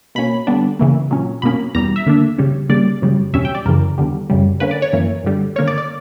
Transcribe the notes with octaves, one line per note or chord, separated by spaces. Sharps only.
B2 A#3 C#4 B5
D3 G3 B3 D4
C#3 E3 A#3
A#2 F#3 C#4
B2 A#3 C#4 B5
E2 B2 G3 A#5
E5
D3 A#3 D4
C#3 G3 C#4
C#3 G3 A#3 D5
F#2 C#3 G3
E2 B2 G3 C#4 E5
G5
D5
F#2 C#3 E3 A#4
E2 D3 G3
F#2 C#3 G3
D3 A#3 C#4 B4
D5
C#5
F#2 E3 A#3
G2 D3 G3
D3 A#3 C#4 C#5
D5
D5